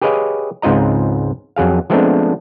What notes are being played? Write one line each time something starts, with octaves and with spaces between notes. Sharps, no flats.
G4 G#4 B4 C#5 D#5 F5
C#2 G#2 C4 F4 D#5 A#5
F2 F#3 G#4 F5
F3 G#3 A3 B3 C4 D4